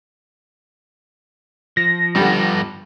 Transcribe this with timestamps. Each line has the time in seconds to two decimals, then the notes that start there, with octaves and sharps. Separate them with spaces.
1.77 F3 A#6
2.16 G2 D3 G3 B3